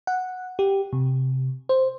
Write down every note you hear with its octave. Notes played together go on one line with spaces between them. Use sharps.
F#5
G4
C3
C5